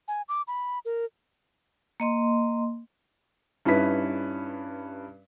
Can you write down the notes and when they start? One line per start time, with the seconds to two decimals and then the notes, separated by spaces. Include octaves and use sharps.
0.08 G#5
0.29 D6
0.48 B5
0.85 A#4
2.00 A#3 D#5 C6
3.65 G2 C#4 D#4 E4 B4 B6